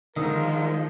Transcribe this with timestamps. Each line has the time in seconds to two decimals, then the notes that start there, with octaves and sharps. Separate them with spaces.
0.16 D3 D#3 F3 G#3 A#4 D#6